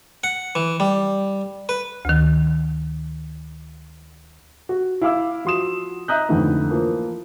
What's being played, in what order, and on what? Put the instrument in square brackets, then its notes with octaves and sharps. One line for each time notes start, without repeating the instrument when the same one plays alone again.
[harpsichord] F#5
E3
G3
B4
[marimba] D2 D#3
[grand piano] F#4
E4 F5 D6 E6
F3 F#4 C6 D#6 E7
D#5 E5 A#5 D#6 F#6 G6
F2 G#2 D3 E3 A3
E3 F3 A#3